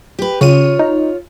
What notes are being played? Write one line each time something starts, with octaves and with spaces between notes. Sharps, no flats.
G4 B4
C#3 F4 C#5 D#7
D#4